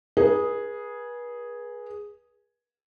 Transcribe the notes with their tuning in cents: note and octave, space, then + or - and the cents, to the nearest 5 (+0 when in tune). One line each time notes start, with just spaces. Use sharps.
G#4 +0 B4 -35